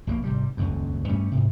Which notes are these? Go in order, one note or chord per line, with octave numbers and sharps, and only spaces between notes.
A#1 B2 F#3 A#3
G#1 C3 G3
D#1 C#2 F#2
G2 G3 A3 C#4
G#2 C3